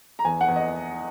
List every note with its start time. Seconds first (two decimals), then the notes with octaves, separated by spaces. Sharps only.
0.19 A#5
0.25 E2 G#5
0.41 F#5
0.48 E2
0.56 D#5